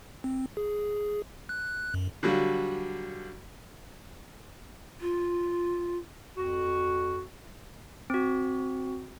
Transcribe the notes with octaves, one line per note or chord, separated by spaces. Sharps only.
C4
G#4
F#6
F#2
D3 F#3 G3 F4 F#4
F4
F2 F#4
C4 F#4